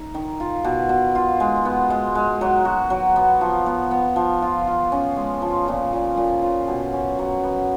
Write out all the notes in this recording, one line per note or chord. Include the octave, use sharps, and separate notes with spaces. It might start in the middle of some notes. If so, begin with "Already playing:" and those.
Already playing: D#4
D#3
F4
B2
B2
F4
G#3
B3
G#3
G#3
F#3
F#4
F#3
B3
F3
B3
B3
F3
F4
F4
C#4
G#3
F3
A#2
A#2
A#2
F4
B2
C#4
F#3
B3